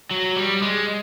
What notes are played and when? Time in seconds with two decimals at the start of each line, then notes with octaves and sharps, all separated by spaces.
0.11 F#3
0.36 G3
0.62 G#3